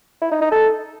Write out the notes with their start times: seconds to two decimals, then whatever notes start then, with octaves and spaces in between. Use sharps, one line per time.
0.22 E4
0.32 D#4
0.42 D#4
0.52 A4